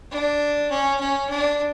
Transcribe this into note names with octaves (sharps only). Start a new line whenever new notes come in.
D4
C#4
C#4
D4